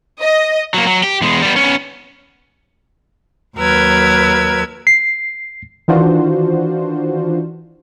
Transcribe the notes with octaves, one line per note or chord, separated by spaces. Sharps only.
D#5
F#3 A#3
F#3
G4
E2 G#3
G3 B3
B3 C#4
D#2 F#3 A#4 B4 E6 G#6
C7
D#3 E3 D4 F4 F#4 C5